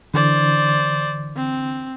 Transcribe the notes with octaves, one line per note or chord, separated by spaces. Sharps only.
D3 E3 C5 D5
C4